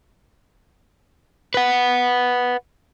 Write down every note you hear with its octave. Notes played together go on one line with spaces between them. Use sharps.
B4 F#5